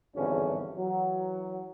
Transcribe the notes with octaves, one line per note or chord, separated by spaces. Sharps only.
G#1 E2 G2 D3 C#4
E3 F#3